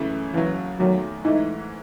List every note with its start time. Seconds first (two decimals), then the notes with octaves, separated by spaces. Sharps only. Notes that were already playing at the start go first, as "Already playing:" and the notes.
Already playing: F#2 C#3 E3 A3
0.34 D#2 C#3 E3 F#3
0.79 E2 D#3 F#3 A3
1.24 G#2 E3 A3 D#4 E4